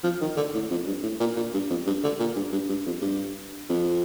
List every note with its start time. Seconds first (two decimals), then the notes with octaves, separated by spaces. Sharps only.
0.03 F3
0.21 D#3
0.37 D3
0.54 A2
0.71 F2
0.87 G2
1.03 A2
1.20 A#2
1.36 A#2
1.54 G2
1.70 F2
1.87 G2
2.04 D3
2.19 A#2
2.36 G2
2.52 G2
2.69 G2
2.86 F2
3.02 G2
3.69 F2